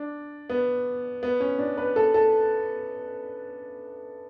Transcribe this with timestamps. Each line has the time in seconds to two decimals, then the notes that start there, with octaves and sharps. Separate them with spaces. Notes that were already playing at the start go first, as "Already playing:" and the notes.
Already playing: D4
0.50 B3
1.23 B3
1.40 C#4
1.59 D4
1.77 B4
1.96 A4
2.14 A4